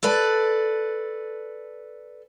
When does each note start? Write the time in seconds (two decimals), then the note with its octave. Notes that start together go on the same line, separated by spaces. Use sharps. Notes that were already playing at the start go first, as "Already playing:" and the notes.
0.03 A4 B4 D5